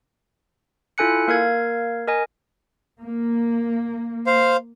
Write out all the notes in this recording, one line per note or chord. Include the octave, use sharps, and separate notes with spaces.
E4 F4 A4 G#5 F#6 C#7
A#3 A#4 F5 G#6
A#4 D#5 G#5
A#3
C5 F5